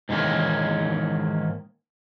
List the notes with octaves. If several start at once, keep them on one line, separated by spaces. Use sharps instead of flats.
G#2 D#3 E3 A#3 C#4